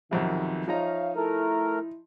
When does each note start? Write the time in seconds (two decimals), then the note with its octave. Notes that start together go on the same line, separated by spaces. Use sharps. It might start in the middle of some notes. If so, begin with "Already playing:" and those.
0.11 B1 F2 C3 D#3
0.68 F3 D#4 C#5 E5 F5 A#5
1.16 A3 E4 A#4